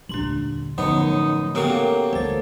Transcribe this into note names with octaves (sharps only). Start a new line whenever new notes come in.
D#1 D3 D4 C6 F#7
F#2 A2 D3 F3 B3 D#4 C#7
C#3 A#3 B3 F#4 G4 A4 A#4
D2 D#3 A4 C5 A6